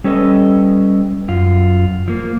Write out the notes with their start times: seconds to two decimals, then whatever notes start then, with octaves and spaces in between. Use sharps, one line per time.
0.04 G3 C#4 A4 B4 D#5
1.28 F#2 F4
2.08 F3 A#3